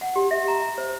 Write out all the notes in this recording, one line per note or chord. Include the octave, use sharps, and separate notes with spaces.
F#5
G4
E5
A#5
E5
C5